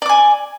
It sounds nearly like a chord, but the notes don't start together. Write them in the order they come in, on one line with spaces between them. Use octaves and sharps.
D5 D6 G#5